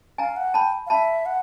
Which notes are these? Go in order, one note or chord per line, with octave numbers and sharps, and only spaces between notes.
F5 G#5 A#5
F#5
G5 A5 B5
F5
E5 A5 B5
F#5